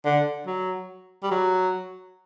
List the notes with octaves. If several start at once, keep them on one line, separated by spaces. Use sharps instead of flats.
D3
F#3
G3
F#3